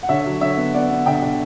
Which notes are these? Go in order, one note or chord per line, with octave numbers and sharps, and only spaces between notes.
F#5
D3 C#5 E5
F#3
D3 C#5 E5
B3
B3 D5 F#5
B3
D3 E5 G5
D3